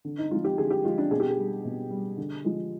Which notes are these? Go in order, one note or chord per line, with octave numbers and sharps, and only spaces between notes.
D3
D#4
F3 G#3 F4
G4
D3 G#4
G4
F3 G#3 F4
D4
B2 G#4
G4
G#4
G3
B2
G3
D3
F3 G#3